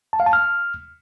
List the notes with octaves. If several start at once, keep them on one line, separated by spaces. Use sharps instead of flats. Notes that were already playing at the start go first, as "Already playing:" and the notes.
A5
F5
A5
F6